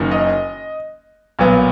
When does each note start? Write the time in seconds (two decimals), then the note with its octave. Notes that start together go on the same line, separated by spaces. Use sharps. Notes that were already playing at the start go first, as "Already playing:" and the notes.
Already playing: F#1 F#2 D#3 F#3 C#4
0.11 D#5
1.39 B1 A#2 F#3 B3